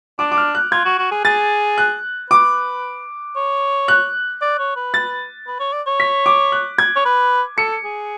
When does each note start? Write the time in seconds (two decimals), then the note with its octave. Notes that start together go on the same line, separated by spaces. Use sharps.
0.19 D4 D6
0.32 D6
0.37 F6
0.55 F#6
0.72 F4 G#6
0.85 F#4
0.99 F#4
1.11 G#4
1.24 G#4 A6
1.78 F#6
2.30 B4 D6
3.36 C#5
3.88 F#6
4.42 D5
4.59 C#5
4.76 B4
4.94 A6
5.47 B4
5.60 C#5
5.73 D5
5.87 C#5
6.00 B6
6.26 D6
6.52 F#6
6.78 G#6
6.96 C#5
7.05 B4
7.58 A4 C#7
7.84 G#4